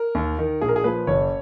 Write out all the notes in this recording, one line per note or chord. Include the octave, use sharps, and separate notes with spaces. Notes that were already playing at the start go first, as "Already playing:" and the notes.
Already playing: A#4
D#2
D#3
A#1 G#4
A#4
G#4
A#2 F3 B4
F#1 C#5